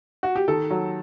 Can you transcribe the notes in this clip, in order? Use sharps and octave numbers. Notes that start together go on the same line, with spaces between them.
F#4
G4
D#3 A4
F#3